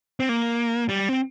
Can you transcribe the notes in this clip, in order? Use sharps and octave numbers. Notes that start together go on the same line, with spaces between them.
C4
A#3
G3
C4